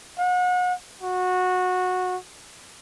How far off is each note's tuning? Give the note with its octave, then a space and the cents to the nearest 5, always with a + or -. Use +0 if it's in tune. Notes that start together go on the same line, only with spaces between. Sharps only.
F#5 -35
F#4 -15